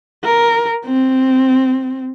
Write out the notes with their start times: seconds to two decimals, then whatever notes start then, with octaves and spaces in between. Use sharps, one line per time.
0.24 A#4
0.85 C4